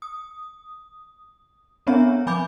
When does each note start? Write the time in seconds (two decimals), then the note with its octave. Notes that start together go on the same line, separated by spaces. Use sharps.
0.02 D#6
1.87 B3 C4 D4 C#5 E5 A#5
2.27 F3 G#5 B5 D6 G6